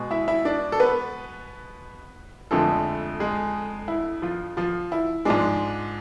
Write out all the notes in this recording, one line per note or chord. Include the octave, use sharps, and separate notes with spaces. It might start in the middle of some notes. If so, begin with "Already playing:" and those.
Already playing: B2 G#3
E4 E5
E4 E5
D4 D5
A4
B3 B4
F2 D3 F3 G#3 A3 A4
G#3 G#4
E4
F3 F4
F3 F4
E4
G#2 F3 G#3 D4